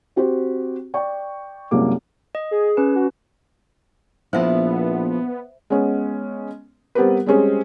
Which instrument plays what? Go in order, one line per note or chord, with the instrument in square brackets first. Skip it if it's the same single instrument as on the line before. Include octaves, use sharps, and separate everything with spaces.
[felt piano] C4 F#4 G4 C5
D5 G5 C#6
C2 F#2 G#3 A#3 D6
[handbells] D#5
[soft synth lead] G#4
[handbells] C#4 B4
[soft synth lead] F#4
[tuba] A#1 [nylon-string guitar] F3 E4 [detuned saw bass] B3 [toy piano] C5 E5
[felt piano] G#3 B3 C#4
G3 B3 C4 G4 A#4 B4
G3 G#3 C4 C#4 G#4 C5